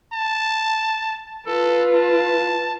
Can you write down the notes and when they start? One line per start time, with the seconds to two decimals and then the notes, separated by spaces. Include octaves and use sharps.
0.13 A5
1.46 F4 A4 B4
1.95 A5